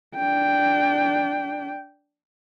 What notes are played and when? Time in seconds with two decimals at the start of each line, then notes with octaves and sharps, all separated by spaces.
0.16 D4 G5